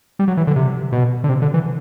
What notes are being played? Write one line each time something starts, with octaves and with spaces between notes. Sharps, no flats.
G3
F#3
E3
D3
C3
B2
D3
C3
D3
E3